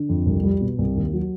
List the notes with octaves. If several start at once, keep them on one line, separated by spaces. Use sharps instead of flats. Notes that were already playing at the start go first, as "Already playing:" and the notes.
Already playing: D3
F2
C2
G3
B2
C2
D#2
F#3